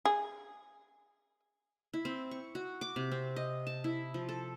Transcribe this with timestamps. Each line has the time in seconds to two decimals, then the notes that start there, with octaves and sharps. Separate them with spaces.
0.05 G#4
1.94 E4
2.05 C4
2.31 C#6
2.55 F#4
2.81 D6
2.96 C3
3.12 C4
3.36 D#5
3.67 A5
3.84 E4
4.14 F3
4.29 A4